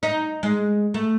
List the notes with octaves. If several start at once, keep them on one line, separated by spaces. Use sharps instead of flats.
D#4
G#3
A3